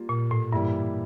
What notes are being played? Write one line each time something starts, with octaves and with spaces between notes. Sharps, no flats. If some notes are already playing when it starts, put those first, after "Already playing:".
Already playing: G3 A#3 F4
A#2
A2
G2 E3 G3 A#3 E4